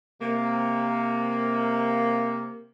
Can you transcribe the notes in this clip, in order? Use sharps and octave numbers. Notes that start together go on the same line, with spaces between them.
C3 A#3